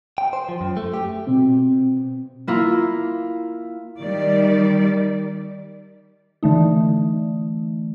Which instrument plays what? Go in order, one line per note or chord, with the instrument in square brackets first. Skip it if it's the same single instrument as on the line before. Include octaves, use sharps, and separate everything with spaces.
[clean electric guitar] G5
C5
F3
F#2
A3
G4
[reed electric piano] B2 C4
[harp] A#3 E4 F4
[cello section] D#3 G3 D5
[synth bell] D3 E3 A3 D#4